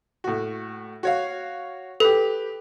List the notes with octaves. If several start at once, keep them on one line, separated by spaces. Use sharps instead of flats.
A2 F#4
F#4 C#5 F5
G4 A4 B4